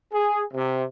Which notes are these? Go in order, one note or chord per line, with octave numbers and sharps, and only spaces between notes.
G#4
C3